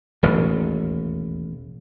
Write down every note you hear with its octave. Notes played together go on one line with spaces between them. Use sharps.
E1 A1 D#2